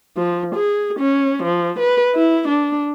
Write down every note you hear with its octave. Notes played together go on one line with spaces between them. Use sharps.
F3
G#4
C#4
F3
B4
E4
D4